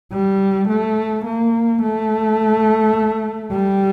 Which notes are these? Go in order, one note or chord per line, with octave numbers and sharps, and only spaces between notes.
G3
A3
A#3
A3
G3